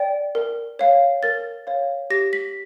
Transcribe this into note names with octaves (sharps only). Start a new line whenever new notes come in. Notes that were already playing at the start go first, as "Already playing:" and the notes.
Already playing: D5 G5
A#4
C#5 F5
A#4 A6
C#5 F5
G4 A#6
B6